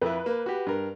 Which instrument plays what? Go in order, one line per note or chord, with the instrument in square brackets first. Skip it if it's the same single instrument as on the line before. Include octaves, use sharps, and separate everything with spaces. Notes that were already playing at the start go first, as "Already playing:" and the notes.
[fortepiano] F2 E4 [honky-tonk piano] B4
[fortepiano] A#3
F#4 G4
G2 A#4